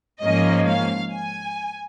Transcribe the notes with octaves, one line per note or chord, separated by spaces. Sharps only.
G#2 F3 A#3 C#4 D#5
F5
G#5